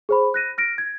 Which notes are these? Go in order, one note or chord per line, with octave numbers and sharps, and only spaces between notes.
G#4 C5 B5
F#6 A#6 D#7
F6 A#6 D7
G#6